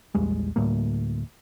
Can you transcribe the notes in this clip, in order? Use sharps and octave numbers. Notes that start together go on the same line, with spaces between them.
A#1 E2 G3 G#3
D2 A2 G3 A#3